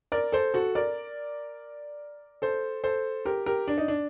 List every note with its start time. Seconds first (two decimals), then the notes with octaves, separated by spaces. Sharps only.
0.12 A#4 D5
0.32 A4 C5
0.54 F#4 A4
0.75 A#4 D5
2.42 A4 C5
2.84 A4 C5
3.25 G4 A#4
3.46 G4 A#4
3.68 D4
3.78 D#4
3.88 D4